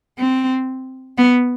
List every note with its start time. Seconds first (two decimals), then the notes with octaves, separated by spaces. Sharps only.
0.19 C4
1.18 B3